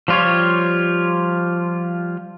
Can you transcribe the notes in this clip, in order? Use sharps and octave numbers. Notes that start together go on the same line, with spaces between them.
F3 G3 F4 G4 C#5